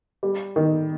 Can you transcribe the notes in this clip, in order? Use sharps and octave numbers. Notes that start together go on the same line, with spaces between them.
G3
D#3